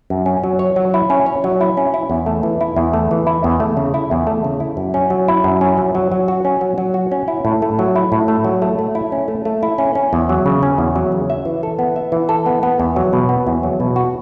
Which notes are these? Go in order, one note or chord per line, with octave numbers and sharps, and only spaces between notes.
F#2
C#4
F#3
C#5
F#3
E4
C#4
C#5
F#3
E4
C#4
E4
E2
A3
E3
E4
E2
A3
E3
E4
E2
A3
C#3
E4
E2
A3
C#3
E4
F#2
C#4
F#3
E4
F#2
C#4
F#3
F#3
F#3
F#4
C#4
F#3
F#3
F#4
C#4
E4
A2
A3
F#3
E4
A2
A3
F#3
A3
A3
E4
C#4
A3
A3
E4
C#4
C#4
E2
F#3
C#3
C#4
E2
F#3
C#3
E5
E3
A4
B3
E5
E3
A4
B3
B3
E2
F#3
B2
B3
E2
F#3
B2
F#4